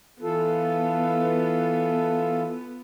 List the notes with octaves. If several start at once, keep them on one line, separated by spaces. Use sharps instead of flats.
E3 B3 F4 A4